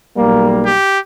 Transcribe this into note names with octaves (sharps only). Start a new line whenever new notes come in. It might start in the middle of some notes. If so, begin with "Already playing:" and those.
B1 G3 A#3
G4